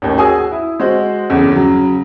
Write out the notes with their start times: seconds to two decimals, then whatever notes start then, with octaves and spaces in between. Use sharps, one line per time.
0.02 A1 D#2
0.17 F#4 G#4 G#5 D#6 E6
0.51 E4
0.80 G#3 F#4 C5
1.30 G1 E2 C#3
1.52 C#3 F#3